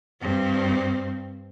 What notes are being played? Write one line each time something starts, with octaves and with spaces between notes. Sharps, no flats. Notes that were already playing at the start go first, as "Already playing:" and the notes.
G2 C4